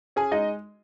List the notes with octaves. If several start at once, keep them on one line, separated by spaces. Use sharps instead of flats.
C#4 G#4 G#5
G#3 D#4 D#5